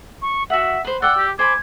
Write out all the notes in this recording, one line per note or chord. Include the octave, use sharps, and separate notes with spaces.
C#6
F#4 E5 F#5
B4 C5
D5 F#5 G5 E6
G4
C5 G#5 B5 D6 G#6